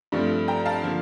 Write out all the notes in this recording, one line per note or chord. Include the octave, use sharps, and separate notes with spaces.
G2 F3 A3 C4
G5 A#5
A#5
F5 A5
D3 F3 A#3